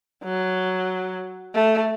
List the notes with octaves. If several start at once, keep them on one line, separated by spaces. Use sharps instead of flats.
F#3
A3